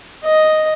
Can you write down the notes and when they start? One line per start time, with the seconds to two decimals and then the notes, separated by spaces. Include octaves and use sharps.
0.25 D#5